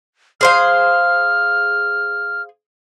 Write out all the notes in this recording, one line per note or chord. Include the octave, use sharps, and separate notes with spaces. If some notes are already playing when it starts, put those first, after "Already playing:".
G#4 C5 F5 F6